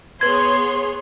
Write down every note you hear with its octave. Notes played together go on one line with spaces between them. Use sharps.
B3 G#4 B4 C#5 C6 G#6